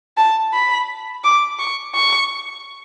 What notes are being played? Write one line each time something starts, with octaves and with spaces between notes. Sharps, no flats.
A5
B5
D6
C#6
C#6